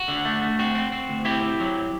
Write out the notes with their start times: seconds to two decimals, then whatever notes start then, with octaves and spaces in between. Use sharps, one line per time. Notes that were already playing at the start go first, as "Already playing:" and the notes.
Already playing: F#4
0.08 D3
0.25 A3
0.42 A3
0.59 C4 F#4
0.75 C4
0.92 C4
1.09 D2
1.25 C4 E4 G4
1.42 C4
1.60 F#3